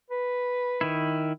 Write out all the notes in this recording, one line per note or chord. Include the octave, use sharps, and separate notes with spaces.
B4
D#3 E4